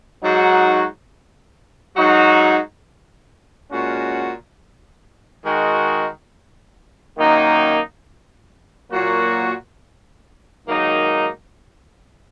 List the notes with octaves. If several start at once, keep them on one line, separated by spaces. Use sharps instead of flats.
G#2 F#3 D#4 F#4
G#2 F#3 D#4 F#4
A#2 G#3 C#4 F#4
D#3 G#3 F#4
F#2 D#3 A#3 D#4
A#2 F#3 A#3 F#4
G#2 D#3 F#3 A#3 D#4